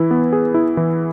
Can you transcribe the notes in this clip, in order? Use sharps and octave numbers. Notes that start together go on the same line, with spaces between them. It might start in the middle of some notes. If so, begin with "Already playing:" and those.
Already playing: E3 E4
B3
G#4
E4
E3